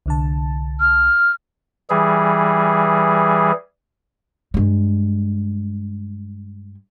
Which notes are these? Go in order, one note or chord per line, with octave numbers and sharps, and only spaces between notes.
C2 D3 A5
F6
E3 G3 G#4
G2 G#3